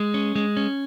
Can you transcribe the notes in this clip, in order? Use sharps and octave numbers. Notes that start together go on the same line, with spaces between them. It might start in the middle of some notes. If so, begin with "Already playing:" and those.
Already playing: G#3
C#4
G#3
C#4